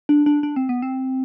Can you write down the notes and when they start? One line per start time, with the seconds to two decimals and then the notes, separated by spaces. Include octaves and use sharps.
0.09 D4
0.26 D4
0.43 D4
0.56 C4
0.69 B3
0.82 C4